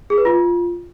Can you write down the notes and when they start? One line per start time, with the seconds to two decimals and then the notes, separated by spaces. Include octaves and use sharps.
0.10 G#4
0.18 B4
0.25 F4